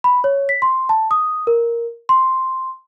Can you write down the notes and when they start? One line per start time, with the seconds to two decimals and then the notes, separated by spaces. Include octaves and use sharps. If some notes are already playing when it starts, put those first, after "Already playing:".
0.04 B5
0.24 C#5
0.49 B6
0.62 C6
0.89 A5
1.11 D#6
1.47 A#4
2.09 C6